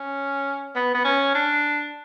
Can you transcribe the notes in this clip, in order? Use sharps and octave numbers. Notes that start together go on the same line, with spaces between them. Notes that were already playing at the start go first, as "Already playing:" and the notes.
Already playing: C#4
B3
B3
C#4
D4